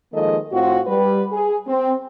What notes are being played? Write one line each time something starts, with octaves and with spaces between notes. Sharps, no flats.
D#3 F3 G#3 A#3 A4 D#5
A2 C4 F4 F#4
G3 B4
G#4
C4